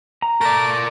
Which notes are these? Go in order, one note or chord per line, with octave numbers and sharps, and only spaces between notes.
A#5
A3 A#4 D5